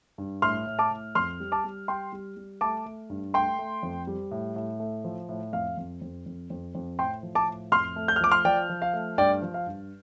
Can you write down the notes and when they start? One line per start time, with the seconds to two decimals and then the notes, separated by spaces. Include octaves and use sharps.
0.18 G2
0.42 A2 C6 F6
0.67 A2
0.79 A5 D6
0.91 A2
1.15 F2 C6 F6
1.40 G3
1.52 A5 D6
1.64 G3
1.88 G3 G5 C6
2.13 G3
2.37 G3
2.61 A3 A5 D6
2.86 A3
3.10 G2
3.34 A3 G5 C6
3.59 A3
3.83 F2
4.07 G3
4.31 A2
4.56 A2
4.80 A3
5.05 F3
5.29 A2
5.53 F2 F5
5.77 F2
6.01 F2
6.26 F2
6.50 F2
6.75 F2
6.99 A2 G5 C6
7.23 F3
7.35 A5 D6
7.48 A2
7.72 F2 C6 F6
7.96 A3
8.08 G6
8.16 F6
8.20 F3 D6
8.31 C6 F6
8.45 F3 D5 G5
8.69 F3
8.82 F5
8.94 A3
9.18 G2 D5 G5
9.42 F3
9.54 F5
9.66 G2